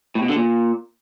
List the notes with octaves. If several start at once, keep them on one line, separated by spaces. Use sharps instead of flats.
A2
B2
D3
A#2